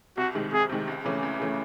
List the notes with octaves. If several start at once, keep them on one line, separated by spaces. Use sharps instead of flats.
C2 F#4
C3 D#3 G#3
C2 G#4
C3 D#3 G#3
C#2
C#3 E3 A3 C#4
C#2
C#3 E3 A3 C#4